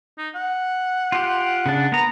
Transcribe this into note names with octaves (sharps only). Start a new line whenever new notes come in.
D#4
F#5
F4 G4
C#3 D4
A#3 B3 A#5